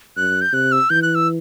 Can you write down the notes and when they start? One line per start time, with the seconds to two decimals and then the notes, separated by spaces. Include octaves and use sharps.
0.17 F#2 F#6
0.41 G6
0.53 C3 F#6
0.72 E6
0.90 E3 G6
1.02 F#6
1.15 E6